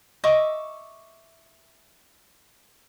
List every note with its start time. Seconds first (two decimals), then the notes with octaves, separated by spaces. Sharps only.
0.24 D#5 E5 C#6 D6